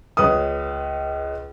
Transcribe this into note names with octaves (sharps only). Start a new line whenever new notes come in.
C#2 B4 C#5 D#6